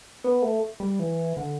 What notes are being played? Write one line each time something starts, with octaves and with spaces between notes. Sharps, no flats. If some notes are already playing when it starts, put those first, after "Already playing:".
B3
A3
G3
E3
D3